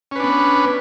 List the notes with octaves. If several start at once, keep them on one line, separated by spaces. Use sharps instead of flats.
B3 C#4 D4 B4